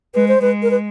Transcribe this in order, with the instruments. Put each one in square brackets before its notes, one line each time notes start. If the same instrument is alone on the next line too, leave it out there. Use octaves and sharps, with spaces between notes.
[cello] G#3 [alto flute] B4
[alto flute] C5
[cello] G#3 [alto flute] B4
[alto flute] A#4
B4